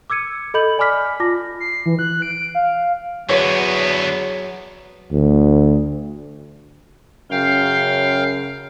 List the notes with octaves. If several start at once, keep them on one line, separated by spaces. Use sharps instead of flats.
D6 E6 G#6 C#7 D#7
A4 D#5 B5 G6 F#7
D5 G#5 B5 D6 F6 B6
F4 A5 D6 A#6
C7
E3
F#6
D7
F5
E2 D3 F#3 B3 C#5
D2
F#2 C#3 F5 G5 C7